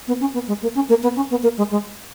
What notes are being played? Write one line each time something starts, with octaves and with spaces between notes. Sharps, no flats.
B3
C#4
B3
G#3
A#3
C#4
A#3
B3
C#4
B3
A#3
G#3
G#3